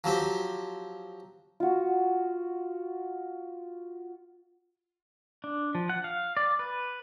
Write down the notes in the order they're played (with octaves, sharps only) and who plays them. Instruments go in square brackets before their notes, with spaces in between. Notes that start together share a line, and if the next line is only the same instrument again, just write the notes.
[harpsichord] F3 F#3 C4 G4
[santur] F4 F#4
[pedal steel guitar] D4
F3
F#5
F5
D5
B4